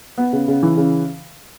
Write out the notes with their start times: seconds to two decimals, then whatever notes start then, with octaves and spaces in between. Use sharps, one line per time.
0.18 B3
0.33 C#3
0.48 C#3
0.63 E3
0.77 C#3